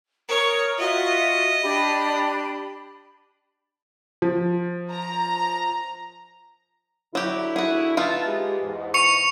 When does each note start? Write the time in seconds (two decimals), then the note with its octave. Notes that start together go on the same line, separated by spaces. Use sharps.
0.29 A#4 C#5 D#6
0.78 F4 F#4 D#5 E5
1.63 D4 G4 B5
4.22 F3
4.91 A#5
7.15 D3 F#3 E4 G4
7.56 F#4 G#4
7.97 B3 D#4 F4 E5 F5 A5
8.26 G#3 G4
8.61 E2 G#2
8.94 C#6 C#7 F7